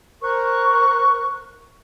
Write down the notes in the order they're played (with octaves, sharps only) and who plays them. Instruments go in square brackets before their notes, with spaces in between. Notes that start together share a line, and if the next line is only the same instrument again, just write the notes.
[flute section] A#4 C5 C#6 F#6